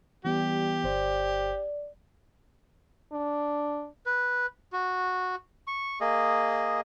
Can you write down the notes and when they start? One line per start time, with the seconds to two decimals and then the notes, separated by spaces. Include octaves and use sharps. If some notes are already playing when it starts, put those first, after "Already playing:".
0.25 E3 G3 B3 G4
0.84 G1 C5 D5
3.13 D4
4.06 B4
4.73 F#4
5.67 C#6
6.01 A#3 G#4 D#5